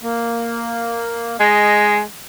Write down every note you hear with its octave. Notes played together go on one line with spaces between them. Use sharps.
A#3
G#3 D#5